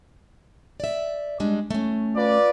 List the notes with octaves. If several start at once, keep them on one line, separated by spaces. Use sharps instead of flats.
D5 E5
G3 G#3 D4
A3 C#4
F4 B4 D5